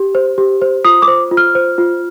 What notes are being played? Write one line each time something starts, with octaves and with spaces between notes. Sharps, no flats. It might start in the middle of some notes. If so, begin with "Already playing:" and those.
Already playing: G4
C5
G4
C5
F4 D#6
D6
C5
F4
F6
C5
F4